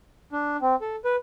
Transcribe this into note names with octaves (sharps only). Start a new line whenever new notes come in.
D4
C4
A4
B4